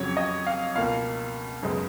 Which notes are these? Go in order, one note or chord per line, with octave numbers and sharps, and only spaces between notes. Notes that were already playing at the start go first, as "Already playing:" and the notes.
Already playing: F2 C#3 F#3 C#5
D#5
F5
C#2 B2 A#3 F5
F#2 C#3 G#3 B3